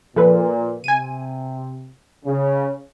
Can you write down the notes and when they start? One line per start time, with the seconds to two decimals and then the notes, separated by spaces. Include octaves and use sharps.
0.16 A#2 F3 A4 B4
0.84 C3 G#5 D#7
2.25 C#3